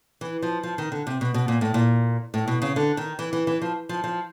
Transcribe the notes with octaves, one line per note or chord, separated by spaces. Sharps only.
E3
F3
F3
D#3
D3
C3
B2
B2
A#2
A2
A#2
A2
B2
C#3
D3
D#3
E3
E3
E3
F3
F3
F3